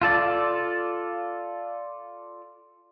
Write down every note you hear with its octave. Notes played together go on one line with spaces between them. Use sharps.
F4 A4 D5